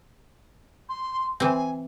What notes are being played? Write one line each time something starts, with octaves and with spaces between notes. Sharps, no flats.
C6
E3 C4 G#5